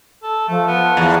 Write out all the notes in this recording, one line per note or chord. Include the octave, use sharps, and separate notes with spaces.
A4
F3 A3
B3
E2